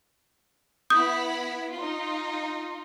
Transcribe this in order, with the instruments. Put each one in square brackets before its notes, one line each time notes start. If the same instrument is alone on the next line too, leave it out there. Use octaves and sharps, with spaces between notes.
[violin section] B3 E4 B5 [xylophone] D#6 G6
[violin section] D#4 F4